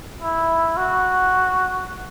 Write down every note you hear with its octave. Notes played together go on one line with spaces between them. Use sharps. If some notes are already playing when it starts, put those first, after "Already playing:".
E4
F#4